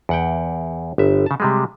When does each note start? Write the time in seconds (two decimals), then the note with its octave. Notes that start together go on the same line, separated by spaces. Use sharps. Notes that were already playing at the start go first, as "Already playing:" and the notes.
0.09 E2 F#5 G5
0.98 G1 E5
1.26 C#3 A5
1.40 C3 G3 G#3